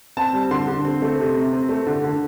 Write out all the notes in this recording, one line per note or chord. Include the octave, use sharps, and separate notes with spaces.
C4 A5
G3
D3 C6
D3
C4
A3
C3
C3
C4
A3
D3
D3